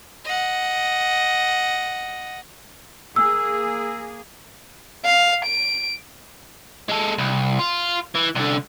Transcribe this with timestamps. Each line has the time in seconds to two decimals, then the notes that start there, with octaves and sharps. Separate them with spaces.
0.25 D#5 F#5
3.16 A#3 G#4 E6
5.05 F5
5.45 D7
6.89 G#3 A4
7.18 C2
7.59 F4
8.15 E3
8.35 C2 D3